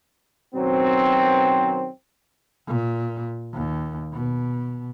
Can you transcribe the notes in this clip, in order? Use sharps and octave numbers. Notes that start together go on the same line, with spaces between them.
F#2 B2 D#3 F#3 C4
A#2
D#2
B2